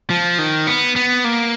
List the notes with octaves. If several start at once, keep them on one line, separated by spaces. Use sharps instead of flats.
F3
D#3
B3
B3
A#3